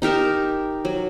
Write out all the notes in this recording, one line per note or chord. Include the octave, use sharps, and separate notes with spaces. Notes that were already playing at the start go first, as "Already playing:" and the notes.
D#4 G4 A#4 A5
F#3